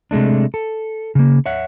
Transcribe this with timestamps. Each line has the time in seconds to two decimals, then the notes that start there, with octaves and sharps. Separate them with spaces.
0.11 C3 G#3 A3 D4
0.54 A4
1.15 C#3 A#3
1.46 C#5 E5 F#5